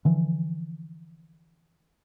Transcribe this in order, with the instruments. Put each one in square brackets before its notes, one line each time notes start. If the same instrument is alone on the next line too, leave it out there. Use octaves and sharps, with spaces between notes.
[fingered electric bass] D3 E3 F3